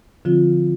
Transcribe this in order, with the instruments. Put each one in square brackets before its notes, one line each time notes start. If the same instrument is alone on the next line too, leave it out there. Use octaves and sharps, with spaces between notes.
[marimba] D3 F3 C4 F4